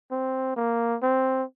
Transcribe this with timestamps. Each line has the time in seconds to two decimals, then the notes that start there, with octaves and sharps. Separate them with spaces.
0.11 C4
0.56 A#3
1.03 C4